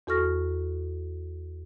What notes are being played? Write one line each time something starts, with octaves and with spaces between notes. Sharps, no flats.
E2 F#4 A4 C#6 F6 A#6